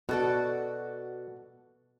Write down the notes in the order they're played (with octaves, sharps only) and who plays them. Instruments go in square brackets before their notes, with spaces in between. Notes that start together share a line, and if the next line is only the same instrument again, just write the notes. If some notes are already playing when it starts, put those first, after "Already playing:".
[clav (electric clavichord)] B2 [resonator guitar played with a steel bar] F#4 A4 D5